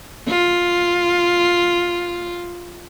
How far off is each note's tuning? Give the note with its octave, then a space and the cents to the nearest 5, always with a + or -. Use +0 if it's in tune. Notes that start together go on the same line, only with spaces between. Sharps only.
F4 +5